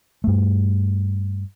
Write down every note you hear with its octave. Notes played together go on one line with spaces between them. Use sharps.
G2 A3